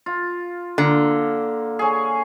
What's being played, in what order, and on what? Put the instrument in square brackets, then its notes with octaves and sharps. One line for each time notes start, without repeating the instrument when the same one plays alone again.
[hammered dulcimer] F4
[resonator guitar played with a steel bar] D3 [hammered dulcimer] A#3
[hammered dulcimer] G#4 C#5